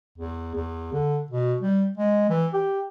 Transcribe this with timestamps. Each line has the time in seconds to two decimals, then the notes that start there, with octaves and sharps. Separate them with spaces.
0.18 E2
0.55 E2
0.92 D3
1.31 B2
1.61 G3
1.98 G#3
2.30 E3
2.53 G4